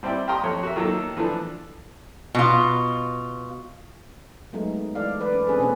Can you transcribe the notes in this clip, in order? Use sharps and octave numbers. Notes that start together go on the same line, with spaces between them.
G3 C4 E4 G4 D5
G4 F5 G5 A#5 C6 D#6
F2 C#5
F#4 A#4 E5
D#3 F#3 A#3 A4
E3 F3 A3 D4
B2 F4
F#3 G#3 A3 B3 D#4
E3 G#3 A4 D5 F5
B4 D5
C#4
C4 D4 G#4 A4 B4
B2 A#3 C#4 G#4 B4 C5